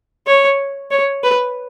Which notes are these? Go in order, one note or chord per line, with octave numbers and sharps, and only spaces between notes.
C#5
C#5
B4